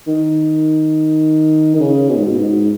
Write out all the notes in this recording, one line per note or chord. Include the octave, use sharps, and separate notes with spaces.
D#3
D#3
C#3
B2
G#2
B2
G#2